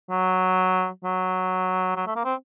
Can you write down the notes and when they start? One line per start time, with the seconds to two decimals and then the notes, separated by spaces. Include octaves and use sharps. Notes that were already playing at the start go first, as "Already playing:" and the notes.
0.10 F#3
1.04 F#3
1.96 F#3
2.07 A3
2.16 A#3
2.25 C4